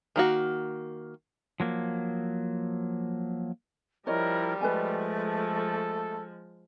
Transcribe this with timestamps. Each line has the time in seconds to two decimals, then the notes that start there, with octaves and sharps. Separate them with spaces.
0.16 D#3 A#3 F#4
1.60 F3 F#3 A#3
4.07 F3 G3 E4 A#4 C#5 D#5
4.61 F3 G#3 A3 B4 D#5 G#5
5.23 A4